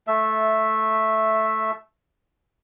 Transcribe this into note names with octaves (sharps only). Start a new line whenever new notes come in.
A3 E5